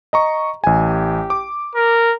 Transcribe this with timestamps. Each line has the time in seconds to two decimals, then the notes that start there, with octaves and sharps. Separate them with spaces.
0.13 D#5 A#5 C#6
0.64 A1 G4 G#5
1.30 D6
1.75 A#4